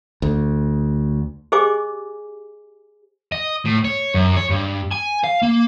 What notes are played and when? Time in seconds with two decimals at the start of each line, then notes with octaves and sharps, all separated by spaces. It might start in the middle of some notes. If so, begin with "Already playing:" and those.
0.22 D2
1.52 G4 G#4 C5 D#5 G#5 D6
3.32 D#5
3.65 A2
3.85 C#5
4.14 F#2
4.37 C#5
4.51 G2
4.92 G#5
5.24 F5
5.43 A#3